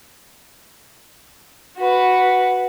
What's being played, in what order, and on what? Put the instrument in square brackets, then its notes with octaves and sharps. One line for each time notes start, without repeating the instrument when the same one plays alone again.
[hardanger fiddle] F#4 B4